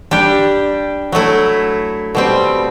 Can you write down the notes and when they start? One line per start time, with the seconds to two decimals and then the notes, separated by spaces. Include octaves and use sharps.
0.11 G3 D4 G4
1.12 F#3 A3 E4
2.15 B2 G3 C4